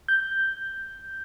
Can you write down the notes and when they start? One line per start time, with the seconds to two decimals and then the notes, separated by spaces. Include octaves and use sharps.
0.08 G6